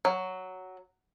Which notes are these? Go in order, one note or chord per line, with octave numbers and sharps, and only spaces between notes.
F#3